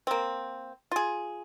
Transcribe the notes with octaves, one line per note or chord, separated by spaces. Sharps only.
A#3 C4
F4 G#4